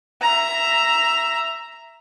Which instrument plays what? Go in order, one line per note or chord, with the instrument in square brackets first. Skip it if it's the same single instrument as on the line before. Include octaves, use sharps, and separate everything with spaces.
[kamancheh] E5 A#5